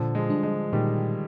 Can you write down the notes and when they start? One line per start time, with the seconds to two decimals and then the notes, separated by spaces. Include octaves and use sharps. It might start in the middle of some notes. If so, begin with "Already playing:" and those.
Already playing: A#2 D3 F3
0.15 F3 G#3
0.30 G3 D4
0.43 F3 G#3
0.73 A#2 D#3 G3